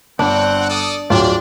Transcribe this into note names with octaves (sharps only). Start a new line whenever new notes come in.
G1 C4 D4 F#5
A4 D5 D#6
D1 F#3 D4 F4 D5 G5